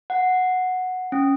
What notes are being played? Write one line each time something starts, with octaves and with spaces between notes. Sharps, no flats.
F#5
C#4